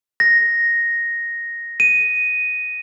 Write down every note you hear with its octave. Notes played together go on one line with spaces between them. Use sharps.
A#6
D#7